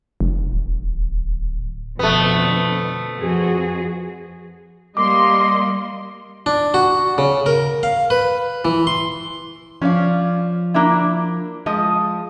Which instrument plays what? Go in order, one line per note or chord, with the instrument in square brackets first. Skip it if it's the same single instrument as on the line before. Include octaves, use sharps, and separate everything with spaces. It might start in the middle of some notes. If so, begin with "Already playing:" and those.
[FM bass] F1
[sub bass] D1
[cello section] F2 B2 D3 [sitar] A3 B3
[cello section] F2 F#4 G#4
[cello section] G3 A#3 [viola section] D#5 C6 [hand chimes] D6
[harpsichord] D4
F#4
C#3
A#4
F5
B4
E3
C6
[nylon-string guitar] F3 [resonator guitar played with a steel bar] C#4 D5 F5
[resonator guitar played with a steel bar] A#3 D4 E4
[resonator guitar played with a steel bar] F3 D#5 [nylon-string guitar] G#3